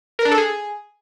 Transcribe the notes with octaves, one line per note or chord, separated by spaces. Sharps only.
A#4
D4
A4
G#4